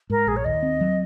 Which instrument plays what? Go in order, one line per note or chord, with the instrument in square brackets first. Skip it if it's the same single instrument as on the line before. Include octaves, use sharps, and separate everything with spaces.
[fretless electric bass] G#2 [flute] A#4
[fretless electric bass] A#1 [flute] G#4
[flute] C#5
[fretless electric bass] D#2 [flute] D#5
[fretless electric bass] C4
F#3